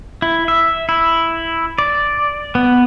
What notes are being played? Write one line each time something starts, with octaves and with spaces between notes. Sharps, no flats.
E4
E5
E4
D5
B3